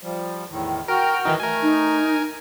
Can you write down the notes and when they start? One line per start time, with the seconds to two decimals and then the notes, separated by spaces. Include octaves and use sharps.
0.03 F3 G3
0.49 E2 A2 D#3
0.88 F#4 A#4 G5 F6
1.25 D#3 E3 D#4
1.40 A3 A#4 G#5
1.62 D#4